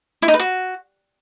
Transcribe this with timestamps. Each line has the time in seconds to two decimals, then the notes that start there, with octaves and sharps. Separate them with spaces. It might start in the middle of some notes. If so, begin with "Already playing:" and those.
0.22 E4
0.28 D#4
0.34 B4
0.40 F#4